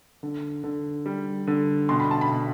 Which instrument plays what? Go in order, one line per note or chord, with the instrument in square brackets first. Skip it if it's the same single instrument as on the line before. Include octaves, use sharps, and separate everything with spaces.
[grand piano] D3
D3
G3
D3
[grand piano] B2 [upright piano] C6
[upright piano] B5
A5
B5
[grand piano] B2